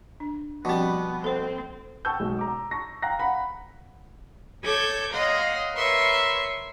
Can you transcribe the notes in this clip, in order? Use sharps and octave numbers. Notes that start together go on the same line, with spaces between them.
D4
B2 F3 G3 B3 C4
C4 A4 C5
G5 A5 C#6 E6 G6
B1 G#3
A#5 D6
A5 C#6 A#6
F5 G5 A#5 F#6 A#6
F#5 A#5 B5
A4 C#5 D6 G6 G#6
C#5 D#5 F5 F#5 A#5 C6
A#4 B4 C#5 E5 C6 C#6